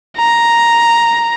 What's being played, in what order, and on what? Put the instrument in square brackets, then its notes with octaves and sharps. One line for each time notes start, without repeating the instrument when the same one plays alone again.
[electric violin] A#5